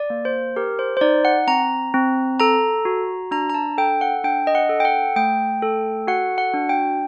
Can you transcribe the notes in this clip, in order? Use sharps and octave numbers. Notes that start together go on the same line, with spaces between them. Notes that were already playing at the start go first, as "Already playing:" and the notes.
Already playing: D5
A#3
C5
G4 A#4
C5
C5
D#4 D5
F#5
C4 A#5
C4
A4 A#5
F#4
D4 A#5
A#5
A5
A4 G5
F#5
D4 G5
D#5
F#5
A4
G5
F#5
A3 G5
A4
F#4 F#5
F#5
D4
G5